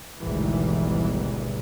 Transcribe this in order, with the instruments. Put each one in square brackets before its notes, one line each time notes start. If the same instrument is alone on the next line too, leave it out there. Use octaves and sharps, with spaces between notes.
[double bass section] G#1 D2 G#2 B2 E3 G3